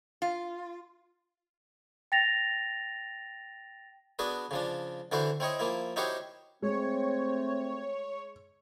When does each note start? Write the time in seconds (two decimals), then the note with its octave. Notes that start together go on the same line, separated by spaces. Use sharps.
0.22 F4
2.12 G5 A6 A#6 F7
4.19 B3 D4 F#4 G#4 B4
4.51 C#3 F3 D4
5.12 D3 E3 E4 F#4 C5
5.40 C4 E4 C#5 D#5
5.59 F3 A#3 E4
5.96 D#4 E4 F#4 G4 C5 C#5
6.62 G#3 A3 C4 C#5